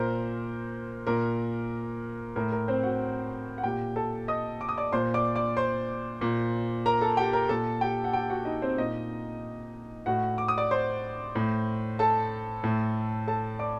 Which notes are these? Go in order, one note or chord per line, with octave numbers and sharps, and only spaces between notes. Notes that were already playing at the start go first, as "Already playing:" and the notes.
Already playing: A#2 A#4 C5
A#2 A#4
A2 A#4
A#4
C4 C5
F#4 F#5
F#5
A#2 G4 G5
A4 A5
D#5 D#6
D6
D#6
D5 D6
A#2 C5 C6
D5 D6
D5 D6
C5 C6
A#2
A#4 A#5
A4 A5
G4 G5
A#4 A#5
A#2 A4 A5
G4 G5
F#5
G4 G5
F#4 F#5
D#4 D#5
C4 C5
A#2 D#4 D#5
A2 F#4 F#5
D6
D#6
D5 D6
C5 C6
A2
A4 A5
A2
A4 A5
D5 D6